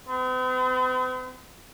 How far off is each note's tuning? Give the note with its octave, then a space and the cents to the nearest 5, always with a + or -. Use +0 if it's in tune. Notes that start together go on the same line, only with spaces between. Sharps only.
C4 -45